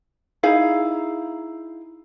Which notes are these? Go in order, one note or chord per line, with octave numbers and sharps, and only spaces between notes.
D#4 E4 G#4 F5